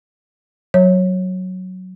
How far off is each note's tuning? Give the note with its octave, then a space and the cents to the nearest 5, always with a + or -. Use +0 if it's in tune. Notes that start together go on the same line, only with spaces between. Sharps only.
F#3 +0 C#5 -15